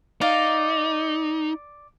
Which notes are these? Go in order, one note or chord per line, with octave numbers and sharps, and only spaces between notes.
D#4 D5 F5